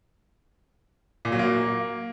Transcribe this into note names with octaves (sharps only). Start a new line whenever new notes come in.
A#2
F#3
A#3